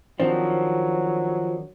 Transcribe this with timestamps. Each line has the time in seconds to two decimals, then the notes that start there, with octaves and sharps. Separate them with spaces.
0.20 D#3 F3 F#3 C4 D4